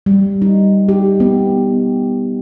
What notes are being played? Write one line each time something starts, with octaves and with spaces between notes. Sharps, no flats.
G3
D#4
G4
B3